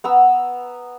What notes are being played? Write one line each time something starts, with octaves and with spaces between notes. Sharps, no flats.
B3 A#5 E6